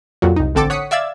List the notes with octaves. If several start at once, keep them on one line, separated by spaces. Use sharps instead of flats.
F2 A#2 F#3
C2 D#4
A1 D3 C4 A4 D6 A6
C#5 F#5 D#6 B6 C#7
D5 E5 F5 E6 G#6 A6